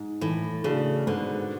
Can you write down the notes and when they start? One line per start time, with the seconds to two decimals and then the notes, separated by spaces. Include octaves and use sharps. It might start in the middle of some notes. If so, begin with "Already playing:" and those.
Already playing: G#2
0.21 A2 E3
0.64 C#3 A3 D4 F#4 A4
1.07 G#2 B2 D3